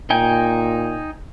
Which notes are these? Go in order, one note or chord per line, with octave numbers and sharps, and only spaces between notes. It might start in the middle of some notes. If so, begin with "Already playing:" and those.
A#2 D#4 G5 G#5